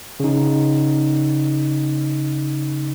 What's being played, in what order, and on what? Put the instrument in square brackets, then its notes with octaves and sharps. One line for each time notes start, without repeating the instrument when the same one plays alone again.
[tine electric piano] C#3 D#4